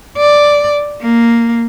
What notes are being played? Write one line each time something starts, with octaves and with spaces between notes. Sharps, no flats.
D5
A#3